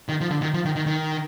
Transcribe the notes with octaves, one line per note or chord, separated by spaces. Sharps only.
D#3
F3
D3
D#3
F3
D#3
D#3
D#3